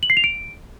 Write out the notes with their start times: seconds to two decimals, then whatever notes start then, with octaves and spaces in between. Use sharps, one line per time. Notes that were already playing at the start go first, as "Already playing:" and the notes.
0.03 F#7
0.10 C7
0.17 F7
0.24 D7